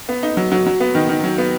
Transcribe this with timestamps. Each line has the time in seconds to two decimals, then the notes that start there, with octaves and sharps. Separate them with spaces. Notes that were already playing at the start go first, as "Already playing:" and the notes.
0.09 B3
0.23 D#4
0.37 F#3
0.52 F#3
0.66 F#3
0.80 B3
0.95 D#3
1.09 D#3
1.24 F#3
1.38 B3